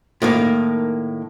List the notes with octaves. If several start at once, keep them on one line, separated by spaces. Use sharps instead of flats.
A2 D#3 A#3